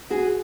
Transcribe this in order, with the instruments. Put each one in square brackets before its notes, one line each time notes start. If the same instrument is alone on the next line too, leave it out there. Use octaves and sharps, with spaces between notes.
[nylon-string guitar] F#4 G#4